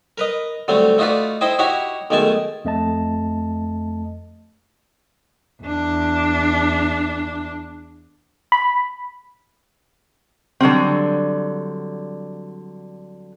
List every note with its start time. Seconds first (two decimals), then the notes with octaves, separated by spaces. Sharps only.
0.18 A#4 B4 D#5
0.68 D3 F#3 G3 A3 C4
0.98 A3 D#4 F4 F#4 B4 D5
1.41 D#4 E4 C5 D#5 G5
1.59 D#4 E4 F#4 G4 C#5 F#5
2.10 B1 D#3 G#3 A3 G#5 A5
2.65 F2 A3 D#5 A5
5.62 E2 D4
8.52 B5
10.60 D3 F#3 G3 C4